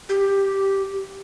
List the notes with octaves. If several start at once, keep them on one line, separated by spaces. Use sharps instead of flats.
G4